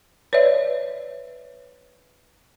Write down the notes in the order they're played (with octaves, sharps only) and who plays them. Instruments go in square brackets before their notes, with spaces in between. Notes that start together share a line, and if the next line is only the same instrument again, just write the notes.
[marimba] B4 C#5 D5 E5